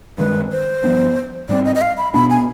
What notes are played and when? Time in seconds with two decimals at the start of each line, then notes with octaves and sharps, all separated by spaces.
0.18 G2 D#3 G#3 B4
0.51 C5
0.84 G2 F3 B3 D4
1.49 G#2 G3 C4 D5
1.65 D#5
1.75 D#5
1.81 F5
1.98 B5
2.14 B2 B3 D4 B5
2.30 G#5